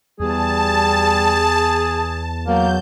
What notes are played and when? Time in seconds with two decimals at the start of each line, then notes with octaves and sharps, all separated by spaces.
0.20 E2 G3 G#4 A5
2.48 F#3 A#3 G6